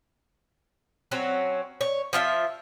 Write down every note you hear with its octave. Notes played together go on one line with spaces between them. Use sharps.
F#3 C4 C#4
C#5
F3 F4 E5